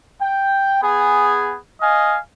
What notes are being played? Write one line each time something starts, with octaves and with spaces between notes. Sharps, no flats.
G5
B3 G#4
D#5 F5 G#5